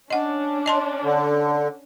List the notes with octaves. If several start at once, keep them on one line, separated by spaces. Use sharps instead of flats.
C#4 D4 D#5 F#5
D#5 A5 C6
D3